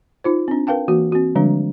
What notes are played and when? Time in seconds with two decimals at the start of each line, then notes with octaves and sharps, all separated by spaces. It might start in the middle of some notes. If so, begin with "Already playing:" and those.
0.24 D#4 F4 C5
0.48 C4 D4
0.67 A#4 B4 F5 G5 A5
0.88 E3 A#3 F#4
1.12 C4 F#4
1.35 D3 F3 G3 G#3 D4